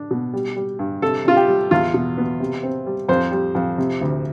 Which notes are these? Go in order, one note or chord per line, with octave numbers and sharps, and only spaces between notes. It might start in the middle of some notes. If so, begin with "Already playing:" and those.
Already playing: D4
B2
G3
G3
G2
C3 A4
C3 F4
G4
G3
E2 F4
B2
B3
C3
C4
G3
F2 C5
G3
F2
C3
D2